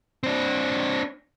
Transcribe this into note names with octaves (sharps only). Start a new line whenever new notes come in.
C4 D4